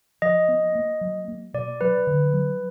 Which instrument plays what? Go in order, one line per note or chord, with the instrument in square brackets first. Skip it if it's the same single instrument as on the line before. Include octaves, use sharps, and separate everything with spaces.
[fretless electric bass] F3 [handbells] D#5
[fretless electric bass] B3
A#3
F#3
A#3
[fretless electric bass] B2 [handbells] D5
[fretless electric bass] F#3 [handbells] B4
[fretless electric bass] D3
F#3